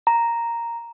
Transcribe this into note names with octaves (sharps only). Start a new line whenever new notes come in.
A#5